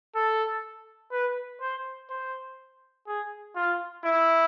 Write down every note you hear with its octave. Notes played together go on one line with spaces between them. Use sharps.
A4
B4
C5
C5
G#4
F4
E4